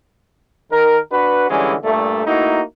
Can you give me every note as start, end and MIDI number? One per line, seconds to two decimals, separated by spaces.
0.71 0.99 51
0.71 0.99 70
1.12 1.46 62
1.12 1.46 66
1.12 1.46 71
1.50 1.74 50
1.50 1.74 52
1.50 1.74 55
1.50 1.74 56
1.50 1.74 61
1.84 2.26 43
1.84 2.26 46
1.84 2.26 57
2.27 2.61 57
2.27 2.61 58
2.27 2.61 63
2.27 2.61 64
2.27 2.61 66